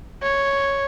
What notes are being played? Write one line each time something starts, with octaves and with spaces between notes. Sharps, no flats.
C#5